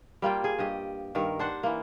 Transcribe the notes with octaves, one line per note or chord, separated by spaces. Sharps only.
G3 A#3 F4 G5
G#4
G2 G4 D#5
G2 D#3 A#4
D4 C5 F#5
E3 A#3